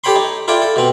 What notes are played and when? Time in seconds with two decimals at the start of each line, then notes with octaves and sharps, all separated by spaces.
0.04 G4 A4 C#5 G5 B5 C6
0.16 D#4
0.48 E4 F4 A4 D5 G5
0.62 A4
0.76 B2 C4